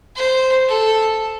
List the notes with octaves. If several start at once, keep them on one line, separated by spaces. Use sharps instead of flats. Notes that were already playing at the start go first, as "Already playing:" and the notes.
C5
A4